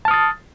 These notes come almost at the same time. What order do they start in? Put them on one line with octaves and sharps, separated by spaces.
A5 F6 D#6 A6